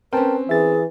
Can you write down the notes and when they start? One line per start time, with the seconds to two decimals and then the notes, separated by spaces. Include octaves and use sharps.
0.13 C4 C#4 A#4 B4 G5 A5
0.49 E3 G#4 E5 A6